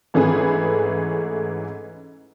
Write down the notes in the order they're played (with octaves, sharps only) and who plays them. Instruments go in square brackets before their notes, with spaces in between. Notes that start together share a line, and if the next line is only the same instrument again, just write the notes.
[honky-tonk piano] G#2 E3 A3 C#4 G#4 B4